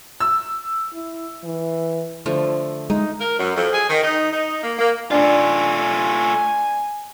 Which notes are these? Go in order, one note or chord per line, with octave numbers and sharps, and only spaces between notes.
E6
E4
E3
D3 F3 A3
G#3 D#4
A#4
F#2
F2
G#4
D#3
D#4
D#4
A#3
A#3
A3 D4 F4 G#5